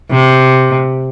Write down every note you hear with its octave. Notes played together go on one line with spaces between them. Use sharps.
C3